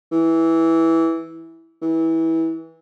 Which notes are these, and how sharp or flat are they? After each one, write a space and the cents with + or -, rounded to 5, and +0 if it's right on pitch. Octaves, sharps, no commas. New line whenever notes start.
E3 -10
E3 -20